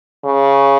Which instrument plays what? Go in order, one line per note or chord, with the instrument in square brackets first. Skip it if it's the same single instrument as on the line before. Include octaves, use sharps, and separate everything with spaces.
[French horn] C#3